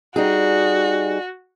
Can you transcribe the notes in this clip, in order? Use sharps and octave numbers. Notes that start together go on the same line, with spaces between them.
G3 D#4 F#4 G#4